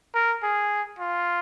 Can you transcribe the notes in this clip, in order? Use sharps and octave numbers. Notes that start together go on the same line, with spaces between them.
A#4
G#4
F4